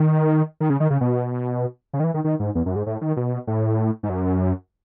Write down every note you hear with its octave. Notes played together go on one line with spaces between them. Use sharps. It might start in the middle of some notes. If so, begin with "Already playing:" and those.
Already playing: D#3
D#3
C#3
D#3
C#3
B2
C#3
D#3
E3
D#3
D#3
G#2
E2
F#2
G#2
A2
D#3
B2
A2
G#2
F#2